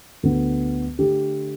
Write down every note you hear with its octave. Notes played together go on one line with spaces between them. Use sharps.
D2 D3 B3
D3 A3 G4